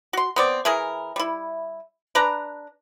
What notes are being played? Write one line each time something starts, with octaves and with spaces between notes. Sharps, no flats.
F#4 C6
B3 C4 D5
E3 E4 G#4 A#4
G3 E4
D4 B4 A#5